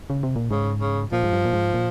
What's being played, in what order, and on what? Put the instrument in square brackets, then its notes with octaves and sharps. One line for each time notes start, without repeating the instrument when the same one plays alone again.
[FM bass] C#3
C3
A#2
[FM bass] G#2 [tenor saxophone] C#3
[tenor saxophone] C#3
[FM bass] A#2 [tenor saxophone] F3
[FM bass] G#2
G2
A#2
G#2
A#2